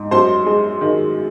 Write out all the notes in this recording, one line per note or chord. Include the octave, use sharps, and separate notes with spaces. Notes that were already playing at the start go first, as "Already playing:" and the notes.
Already playing: G#2
F#2 C5 C6
G#3
D#3